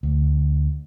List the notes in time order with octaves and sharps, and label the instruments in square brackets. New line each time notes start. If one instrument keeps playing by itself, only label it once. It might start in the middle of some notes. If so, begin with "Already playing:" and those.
[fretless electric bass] D2